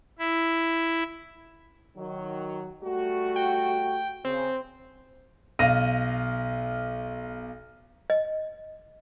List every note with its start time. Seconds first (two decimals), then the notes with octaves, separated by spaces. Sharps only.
0.19 E4
1.97 D#3 F#3
2.83 G3 A3 F#4
3.36 G5
4.25 C#3 C4
5.59 B1 F5 F6 A#6 D#7
8.10 D#5